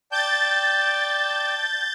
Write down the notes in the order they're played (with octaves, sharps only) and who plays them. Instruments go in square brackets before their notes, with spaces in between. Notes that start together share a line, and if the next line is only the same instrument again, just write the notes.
[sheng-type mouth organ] D5 G5 A5 [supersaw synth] G6 A6